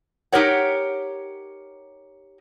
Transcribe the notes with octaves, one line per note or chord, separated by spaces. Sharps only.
D#4 G4 A#4 C#5 F#5